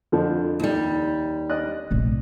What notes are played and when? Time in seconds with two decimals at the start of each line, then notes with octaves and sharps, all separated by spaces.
0.12 F2 D3 F3
0.60 D#2 G3
1.50 D5 D#5 F#6
1.91 F1 A#1